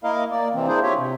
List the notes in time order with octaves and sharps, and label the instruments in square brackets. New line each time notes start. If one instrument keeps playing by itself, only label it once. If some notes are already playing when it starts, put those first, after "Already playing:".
[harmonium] A#3 E4 A#4 D#5 F5
A#3 D5
C3 E3 C4
A#3 D4 E4 G#4 C5
F4 G4 C#5 E5
C3